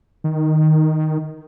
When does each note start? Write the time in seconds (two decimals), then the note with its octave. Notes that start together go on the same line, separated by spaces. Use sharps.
0.24 D#3